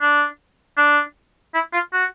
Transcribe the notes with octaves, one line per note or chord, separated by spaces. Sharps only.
D4
D4
E4
F4
F#4